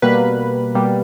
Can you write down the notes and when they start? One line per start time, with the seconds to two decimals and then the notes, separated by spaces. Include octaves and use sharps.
0.02 B2 G3 A#3 B4
0.75 B2 G3 A#3